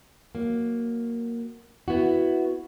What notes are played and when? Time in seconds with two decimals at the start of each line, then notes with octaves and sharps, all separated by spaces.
0.35 F#3 A#3
1.88 B3 E4 F#4